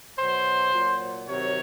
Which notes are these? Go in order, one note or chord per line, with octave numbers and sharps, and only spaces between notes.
B2 F#3 C5
A#2 F#3
C3 D#3 F#3 C#5